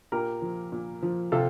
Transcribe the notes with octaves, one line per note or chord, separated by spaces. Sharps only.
A#2 G4 A#4
F3
A#2
F3
C3 F4 A4